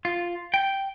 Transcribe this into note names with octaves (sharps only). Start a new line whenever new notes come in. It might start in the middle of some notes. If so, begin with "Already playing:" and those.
F4
G5